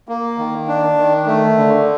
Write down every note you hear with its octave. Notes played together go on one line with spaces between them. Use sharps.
A#3
D#3
D4
D#3
A3
D3